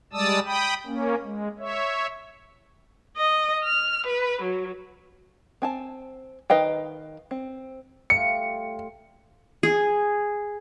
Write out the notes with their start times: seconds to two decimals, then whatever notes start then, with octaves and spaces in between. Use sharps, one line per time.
0.13 G3 G#3 D5 A5 D#6 E6
0.45 G5 B5 D#6
0.86 A#3 C#4
1.23 G#3
1.59 C#5 E5
3.17 D#5
3.64 F6
4.07 B4
4.43 F#3
5.62 C4 G#5 A5
6.50 D#3 B4 D#5 F5 G5
7.31 C4
8.10 G3 A3 F4 C#7
9.63 G#4